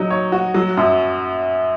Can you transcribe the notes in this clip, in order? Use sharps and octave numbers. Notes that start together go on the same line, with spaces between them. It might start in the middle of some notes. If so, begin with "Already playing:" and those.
Already playing: F#3 D#4
C#5
F#4
F#3
F#2